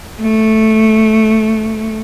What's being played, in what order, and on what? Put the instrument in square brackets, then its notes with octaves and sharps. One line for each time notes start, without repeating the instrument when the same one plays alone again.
[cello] A3